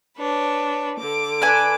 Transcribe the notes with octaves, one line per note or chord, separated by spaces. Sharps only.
D4 B4 C#5
D3 D6
D4 B4 G#5